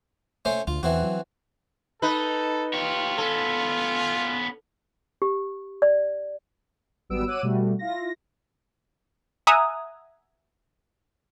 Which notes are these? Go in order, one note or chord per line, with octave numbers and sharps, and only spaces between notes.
A3 C#4 C5
D2 F4
E2 E3 C4 F#4
F#3
D#4 A4 B4
F4 G4 C#5
B3 C#4 A4
G4
D5
G#1 F#3 G3 B3 E6 D7
F#4 C#5 D6 E6 F#6 D#7
B2 G3 A3 F#4
E4 F4 A#6
E5 F#5 G#5 A#5 D#6